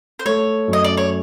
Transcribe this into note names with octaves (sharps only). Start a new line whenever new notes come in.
C5
A3 C#5
F#2
D#5
D5
C#5